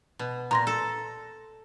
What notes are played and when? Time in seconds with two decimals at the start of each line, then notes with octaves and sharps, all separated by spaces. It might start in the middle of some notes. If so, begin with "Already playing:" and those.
0.19 B2
0.51 A#2 A#5 C6 A#6
0.67 A4